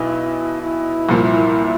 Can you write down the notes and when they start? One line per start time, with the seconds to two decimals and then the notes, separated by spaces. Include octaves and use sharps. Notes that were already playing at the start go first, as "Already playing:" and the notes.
Already playing: B1 B2 E4
0.61 E4
1.09 C2 A#2 F3